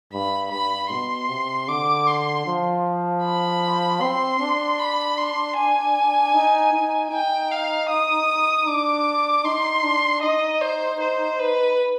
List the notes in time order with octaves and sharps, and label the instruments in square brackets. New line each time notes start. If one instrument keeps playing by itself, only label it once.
[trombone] G2 [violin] B5
[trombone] G2 [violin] B5
[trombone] B2 [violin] C6
[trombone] C3
[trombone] D3 [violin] D6
[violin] C6
[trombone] F3
[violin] B5
[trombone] C4 [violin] C6
[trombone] D4
[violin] B5
C6
G#5
[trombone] D#4
D#4
[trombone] D#4 [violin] G5
[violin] F5
D#6
[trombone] D4 [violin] D6
[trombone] D#4 [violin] C6
[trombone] D4
[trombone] D#4 [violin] D#5
[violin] C5
C5
B4